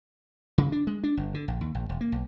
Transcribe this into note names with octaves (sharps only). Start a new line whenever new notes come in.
C#3
D4
G#3
D4
G1
D3
A#1
D#2
A#1
E1
A#3
B1